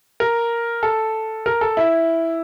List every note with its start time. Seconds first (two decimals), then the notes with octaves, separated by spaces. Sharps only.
0.20 A#4
0.83 A4
1.46 A#4
1.61 A4
1.77 E4